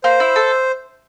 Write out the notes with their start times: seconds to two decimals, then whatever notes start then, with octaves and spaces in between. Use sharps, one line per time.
0.04 A#3 C5
0.20 E4
0.36 A4